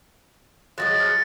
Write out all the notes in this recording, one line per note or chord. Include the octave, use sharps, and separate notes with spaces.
F3 F#3 G#3 F#6 A6 A#6
F6 F#6 C#7